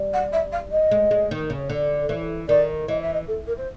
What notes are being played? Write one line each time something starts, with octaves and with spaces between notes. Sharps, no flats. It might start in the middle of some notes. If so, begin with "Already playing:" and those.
Already playing: G3
F#5
E5
F5
D#5
G#3
G#3
D#3
C#3
D3
E3
D#3 D5
E3 D#5
E5
D#5
A4
A#4
C5